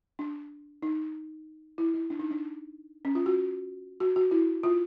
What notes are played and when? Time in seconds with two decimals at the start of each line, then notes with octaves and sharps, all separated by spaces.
0.19 D4
0.82 D#4
1.78 E4
1.94 E4
2.10 D4
2.19 D#4
2.31 D4
3.05 C#4
3.15 F4
3.26 F#4
4.00 F#4
4.16 F#4
4.31 E4
4.63 F4